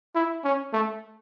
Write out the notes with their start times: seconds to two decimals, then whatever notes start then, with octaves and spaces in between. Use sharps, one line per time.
0.15 E4
0.44 C#4
0.73 A3